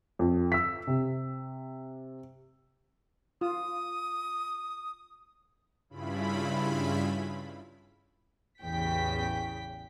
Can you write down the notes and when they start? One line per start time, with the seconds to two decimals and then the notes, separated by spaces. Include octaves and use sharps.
0.19 F2
0.52 E6 B6
0.87 C3
3.41 F4 D#6
5.90 G2 C#3 E4 F4 B5
8.62 A1 E2 C#3 G5 B6